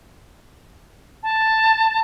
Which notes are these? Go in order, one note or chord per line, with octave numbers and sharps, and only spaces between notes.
A5